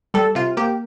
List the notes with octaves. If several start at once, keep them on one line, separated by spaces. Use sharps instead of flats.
G3 A4
C3 F4
A#3 G4